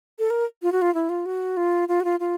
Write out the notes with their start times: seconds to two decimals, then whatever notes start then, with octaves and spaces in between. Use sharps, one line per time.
0.19 A4
0.30 A#4
0.63 F4
0.72 F#4
0.82 F4
0.94 E4
1.09 F4
1.26 F#4
1.57 F4
1.88 F4
2.00 F#4
2.05 F4
2.20 F4